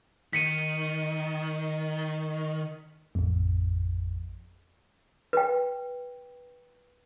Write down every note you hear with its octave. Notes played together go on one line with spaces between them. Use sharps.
D#3 B6 C#7 D#7
A1 F2
B4 G5